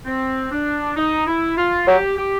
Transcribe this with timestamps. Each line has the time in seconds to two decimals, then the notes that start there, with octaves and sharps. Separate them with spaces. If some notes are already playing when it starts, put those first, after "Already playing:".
0.06 C4
0.52 D4
0.97 D#4
1.27 E4
1.57 F4
1.87 F#3 G4
2.18 G4